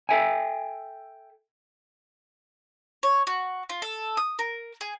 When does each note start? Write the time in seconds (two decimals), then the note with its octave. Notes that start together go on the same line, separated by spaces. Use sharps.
0.09 A4 E5 G5 G#5
3.03 C#5
3.27 F#4
3.69 F4
3.82 A4
4.17 D#6
4.39 A#4
4.81 G#4